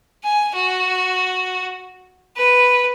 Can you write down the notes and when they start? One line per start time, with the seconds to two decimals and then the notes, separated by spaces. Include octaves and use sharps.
0.24 G#5
0.55 F#4
2.37 B4